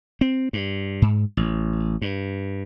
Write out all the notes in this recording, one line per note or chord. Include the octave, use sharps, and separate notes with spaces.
C4
G2
G#2
A1
G2